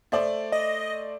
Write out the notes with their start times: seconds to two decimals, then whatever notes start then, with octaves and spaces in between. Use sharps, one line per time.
0.12 A3 C5 D5
0.52 D#5